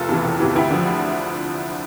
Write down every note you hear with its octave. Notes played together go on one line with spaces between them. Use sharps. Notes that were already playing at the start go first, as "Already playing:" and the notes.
Already playing: F1 F4 A4
E2 C3 E3
F1
E2 C3 E3
D2 E4 G4
D3 F3